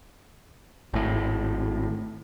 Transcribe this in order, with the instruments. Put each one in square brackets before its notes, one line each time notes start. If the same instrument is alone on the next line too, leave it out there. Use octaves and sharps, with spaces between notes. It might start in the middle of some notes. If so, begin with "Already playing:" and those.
[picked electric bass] G#1 A2